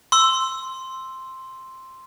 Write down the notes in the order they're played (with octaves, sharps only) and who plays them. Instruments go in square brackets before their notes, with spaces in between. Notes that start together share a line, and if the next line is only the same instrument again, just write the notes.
[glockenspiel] C6 E6